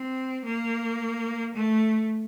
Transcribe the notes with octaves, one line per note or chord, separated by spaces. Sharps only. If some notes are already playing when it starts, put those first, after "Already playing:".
Already playing: C4
A#3
A3